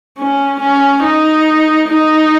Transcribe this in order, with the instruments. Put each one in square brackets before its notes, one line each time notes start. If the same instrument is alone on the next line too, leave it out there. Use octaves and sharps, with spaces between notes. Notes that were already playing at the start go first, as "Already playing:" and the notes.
[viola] C#4
C#4
D#4
D#4